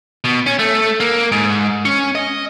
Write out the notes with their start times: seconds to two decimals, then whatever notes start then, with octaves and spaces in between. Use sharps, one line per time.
0.24 B2
0.46 C#4
0.59 A3
1.00 A#3
1.32 G#2
1.85 C#4
2.15 D#5